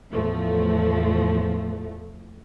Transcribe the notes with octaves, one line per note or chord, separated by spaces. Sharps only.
E2 A2 F3 A3